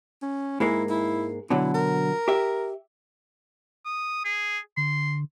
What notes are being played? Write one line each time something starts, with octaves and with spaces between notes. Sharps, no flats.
C#4
G#2 G#3 A#3 E4
E4
B2 D3 F#3 E4
A#4
G4 E5
D#6
G#4
D3 C6